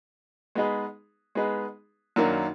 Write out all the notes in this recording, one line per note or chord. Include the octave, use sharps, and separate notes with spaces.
G#3 B3 D#4 G#4 B4
G#3 B3 D#4 G#4 B4
F#2 D#3 F#3 A#3 D4